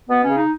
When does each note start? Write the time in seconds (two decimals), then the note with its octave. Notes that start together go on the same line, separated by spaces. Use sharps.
0.09 B2 B3
0.24 C#3 C#4
0.37 D#4